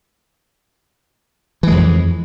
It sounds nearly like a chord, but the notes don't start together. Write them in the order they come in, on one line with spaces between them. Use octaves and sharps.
E3 G#3 F2